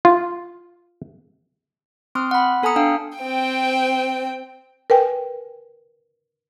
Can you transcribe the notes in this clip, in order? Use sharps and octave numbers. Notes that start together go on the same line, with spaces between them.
F4
C4 C6 D#6 F6
F#5 B5
B3 A4 G#5 A#5 D#6 C#7
D4 F5 G5
C4 G5
A#4 B4 G5 G#5